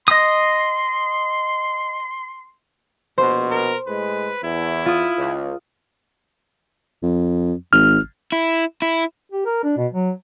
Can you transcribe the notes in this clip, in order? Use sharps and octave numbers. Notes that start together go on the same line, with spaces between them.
D#5 C6 D#6
A#1 B2 C5
A#4
A2 G#3 B4
E2 E4
F4 D#6
C#2
F2
G#1 F6
E4
E4
G4
A#4
D4
B2
F#3